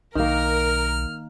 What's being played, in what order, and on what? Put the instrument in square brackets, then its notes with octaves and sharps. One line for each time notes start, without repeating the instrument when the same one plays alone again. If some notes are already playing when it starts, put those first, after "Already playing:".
[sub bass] B1 [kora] D#3 A#3 [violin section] A#4 [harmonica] F6